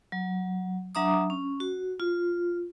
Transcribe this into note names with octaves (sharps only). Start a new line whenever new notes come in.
F#3
F#3 D4 E5 A#5 D6 D#6
C#4
F#4
F4